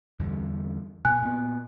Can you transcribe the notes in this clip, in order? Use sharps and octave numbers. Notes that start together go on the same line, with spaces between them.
E2 D3 G3
B2 G#5 F#6
A#2 B3